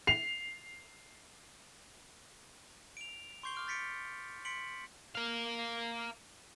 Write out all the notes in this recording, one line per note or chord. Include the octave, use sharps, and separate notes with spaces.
C7 F7
D7 F7
C6 C#6 G6 C7 G7
D6 F6 D7
G6 A6 B6 C#7 D7
C6 B6 C#7 D7 F#7
A#4 F5